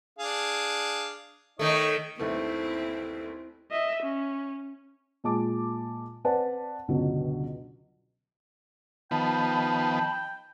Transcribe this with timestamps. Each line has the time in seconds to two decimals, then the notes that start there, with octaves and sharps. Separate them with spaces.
0.19 D4 G#4 F5
1.59 D#3 A3 D#4 C#5 D#5
2.19 G1 D#2 A3 C4 E4
3.71 D#5 E5
4.03 C#4
5.24 A#2 G#3 A5 D6
6.25 C4 B4 C5 D5 F#5 A5
6.88 C#2 G2 B2 D3 F#3
9.11 D#3 F3 B3 G5 A5 B5